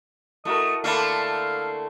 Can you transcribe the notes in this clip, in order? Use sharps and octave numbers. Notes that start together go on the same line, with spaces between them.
A3 E4 F#4 A#4 D#5
D3 A3 A#3 E5 F5 A5 B5